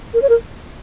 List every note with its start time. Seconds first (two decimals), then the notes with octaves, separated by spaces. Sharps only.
0.14 A#4
0.22 C#5
0.29 A#4